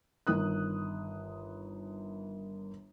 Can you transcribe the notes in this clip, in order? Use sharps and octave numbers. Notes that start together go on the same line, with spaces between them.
G1 D#3 D#6 F#6